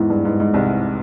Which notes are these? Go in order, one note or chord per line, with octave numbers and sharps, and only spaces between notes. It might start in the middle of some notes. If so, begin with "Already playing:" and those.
Already playing: E2 G#2 E3
G2
G#2
G#2
C2 C3